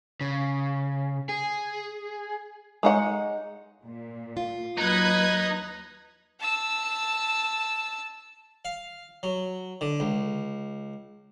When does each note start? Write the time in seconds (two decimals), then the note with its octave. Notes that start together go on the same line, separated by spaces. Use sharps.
0.21 C#3
1.29 G#4
2.83 G#3 D#4 F#5
3.84 A#2
4.37 F4
4.78 D#2 F#3 D#4 B4 D#6 F#6 G#6
6.40 A5 E6
8.65 F5
9.23 F#3
9.81 D3
10.00 C#2